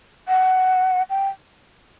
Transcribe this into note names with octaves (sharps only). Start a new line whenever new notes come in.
F#5
G5